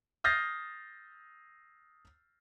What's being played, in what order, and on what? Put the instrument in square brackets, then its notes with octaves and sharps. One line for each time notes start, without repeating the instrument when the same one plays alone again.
[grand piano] D#6 F6 G6 A6 A#6 C7